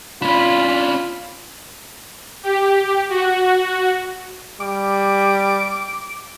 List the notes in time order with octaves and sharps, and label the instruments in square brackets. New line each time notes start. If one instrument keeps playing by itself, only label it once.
[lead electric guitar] C#4 D4 [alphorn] F4 [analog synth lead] B5
[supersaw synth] G4
F#4
[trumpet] G3 [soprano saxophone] D6